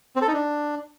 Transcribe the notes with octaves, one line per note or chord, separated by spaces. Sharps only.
C4
A4
D#4
D4